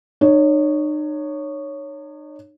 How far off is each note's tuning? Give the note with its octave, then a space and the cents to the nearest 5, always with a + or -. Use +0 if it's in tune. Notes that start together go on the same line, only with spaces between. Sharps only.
D#4 -40 C#5 +0